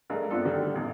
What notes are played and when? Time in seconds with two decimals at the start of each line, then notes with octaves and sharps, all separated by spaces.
0.10 G2 G#3 A3 A#4 D#5
0.30 A3 B3 C4 D4 F4 A4
0.45 D3 D#3 G3 A3
0.74 A1 E2 G2